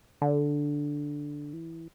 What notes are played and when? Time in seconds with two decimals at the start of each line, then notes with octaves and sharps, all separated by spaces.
0.22 D3
1.53 E3